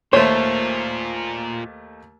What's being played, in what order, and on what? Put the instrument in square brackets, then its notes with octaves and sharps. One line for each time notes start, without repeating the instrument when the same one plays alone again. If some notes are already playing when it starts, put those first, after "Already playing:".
[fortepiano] D#2 A3 [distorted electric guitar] A#2 F4 [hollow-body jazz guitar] C5 [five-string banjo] C#5